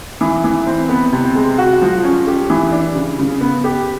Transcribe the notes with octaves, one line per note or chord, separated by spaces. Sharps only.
E3
E3
C4
B3
C3
G#3
F#4
F3
C#4
G4
E3
D4
C#3
C#3
B3
G4